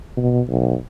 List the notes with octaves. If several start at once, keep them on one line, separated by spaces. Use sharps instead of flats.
B2
B1